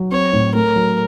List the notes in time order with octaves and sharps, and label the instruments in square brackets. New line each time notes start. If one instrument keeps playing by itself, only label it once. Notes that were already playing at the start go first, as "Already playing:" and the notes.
Already playing: [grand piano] F#3
[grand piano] C4 [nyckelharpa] C#5
[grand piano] A2
[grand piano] A3 [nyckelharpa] A#4
[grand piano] F#3